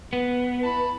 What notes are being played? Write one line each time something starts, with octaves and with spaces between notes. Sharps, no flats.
B3 B4
E4 A5 B5